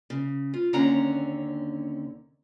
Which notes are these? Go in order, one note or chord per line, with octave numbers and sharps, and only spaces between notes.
C#3
F4
D#2 D3 C4 C#4 F#5 A#5